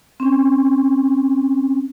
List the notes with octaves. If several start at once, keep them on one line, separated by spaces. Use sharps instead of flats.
C4 C#4